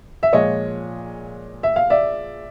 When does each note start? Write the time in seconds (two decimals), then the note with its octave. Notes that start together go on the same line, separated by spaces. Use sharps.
0.23 E5
0.33 A#2 F3 G#3 C#5 D#5
1.63 E5
1.76 F5
1.90 D5 E5